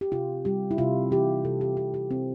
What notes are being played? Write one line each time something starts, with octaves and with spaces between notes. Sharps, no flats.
G4
C3 F4
G3 G4
E4
C3 F4
E3 G4
C3 A4
G4
C3 G4
G4
C3 C4